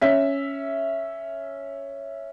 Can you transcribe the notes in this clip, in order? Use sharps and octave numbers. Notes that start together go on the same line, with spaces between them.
C#4 E5 B6